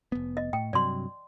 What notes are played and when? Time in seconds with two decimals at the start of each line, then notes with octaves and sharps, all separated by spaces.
0.12 F1 B3
0.37 D#5
0.53 A2 G5
0.73 G2 C3 F#3 D5 C6